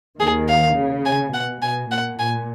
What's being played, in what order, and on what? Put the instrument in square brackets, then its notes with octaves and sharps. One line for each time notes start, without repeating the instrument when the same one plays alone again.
[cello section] D#2 D#3 [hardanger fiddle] G#4
[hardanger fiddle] F5
[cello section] C#3
[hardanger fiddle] G#5
[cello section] B2 [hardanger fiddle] F#5
[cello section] B2 [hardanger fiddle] G#5
[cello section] A#2 [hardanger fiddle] F#5
[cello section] A#2 [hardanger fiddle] G#5